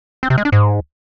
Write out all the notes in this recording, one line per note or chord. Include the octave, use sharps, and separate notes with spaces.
C4
C3
G#3
D4
G#2